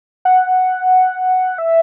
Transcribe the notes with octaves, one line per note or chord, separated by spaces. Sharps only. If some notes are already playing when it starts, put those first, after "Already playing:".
F#5
E5